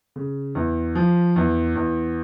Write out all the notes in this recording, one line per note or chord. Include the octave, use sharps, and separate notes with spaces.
C#3
E2
F3
E2
E2